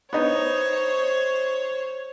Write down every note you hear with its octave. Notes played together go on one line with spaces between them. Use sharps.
B3 D#4 C5 C#5